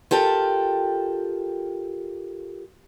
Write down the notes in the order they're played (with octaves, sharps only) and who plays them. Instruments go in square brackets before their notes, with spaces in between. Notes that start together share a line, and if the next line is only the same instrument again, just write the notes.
[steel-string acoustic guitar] F4 G4 A4 A#4 G5